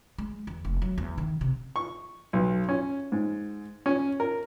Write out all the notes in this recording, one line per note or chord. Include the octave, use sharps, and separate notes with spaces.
G#3
E2
F1
F#3
E2
D#3
C3
C#6
B1
C#4
G#2
C#4
A#4